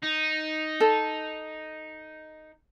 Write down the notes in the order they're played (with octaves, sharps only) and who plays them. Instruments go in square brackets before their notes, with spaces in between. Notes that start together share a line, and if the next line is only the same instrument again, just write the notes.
[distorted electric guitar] D#4
[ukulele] A4